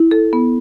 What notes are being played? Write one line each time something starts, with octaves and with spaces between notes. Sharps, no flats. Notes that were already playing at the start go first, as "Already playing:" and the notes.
Already playing: E4
A4
B3